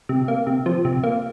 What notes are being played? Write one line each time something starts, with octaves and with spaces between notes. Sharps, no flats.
C3
A#3
C3
F3
C3
A#3